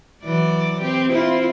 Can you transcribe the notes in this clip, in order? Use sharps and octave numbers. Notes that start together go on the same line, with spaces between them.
E3 F#3 D5
C4 G4
C4 E4 F4